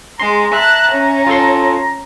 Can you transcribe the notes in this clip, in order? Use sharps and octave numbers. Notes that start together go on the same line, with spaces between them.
G#3 A#5 C6
E5 A5 F#6
C#4
F4 A4 C6